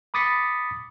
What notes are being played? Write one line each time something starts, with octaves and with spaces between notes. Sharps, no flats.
B5 D6 D#6 A6 B6 C#7